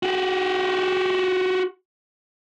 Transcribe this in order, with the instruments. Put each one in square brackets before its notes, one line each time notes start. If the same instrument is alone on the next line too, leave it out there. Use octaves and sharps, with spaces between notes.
[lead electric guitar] F#4 G4